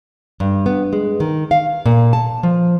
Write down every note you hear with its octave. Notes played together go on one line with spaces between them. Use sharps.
G2
B3
G#3
D#3
F5
A#2
A5
F3